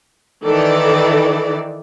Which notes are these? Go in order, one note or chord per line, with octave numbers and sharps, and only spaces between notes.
D#3 E3 A4 D5